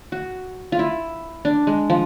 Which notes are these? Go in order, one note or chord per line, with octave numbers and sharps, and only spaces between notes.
F#4
F4
E4
D4
G#3
F3